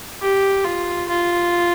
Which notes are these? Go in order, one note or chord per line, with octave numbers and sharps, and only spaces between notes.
G4
F4
F4